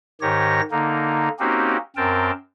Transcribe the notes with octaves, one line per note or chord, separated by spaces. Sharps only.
G#2 D#3 G4 C#5 A#6
D3 A#3 D#4
A#3 C4 C#4 D#4 F#4 G4
F#2 C4 A#4 G5 A5